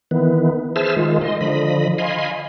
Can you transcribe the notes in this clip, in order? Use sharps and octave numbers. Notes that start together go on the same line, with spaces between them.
D#3 E3 B3
G#4 C5 E5 A5 E6 F6
D#3 G#3 F4
D#5 C6
D3 F3 D#5 B5
D#5 F5 G#5 B5 C6